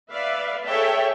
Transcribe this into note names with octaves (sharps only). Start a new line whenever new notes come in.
B4 D5 E5 F5
G#4 A4 C#5 E5 G5 A5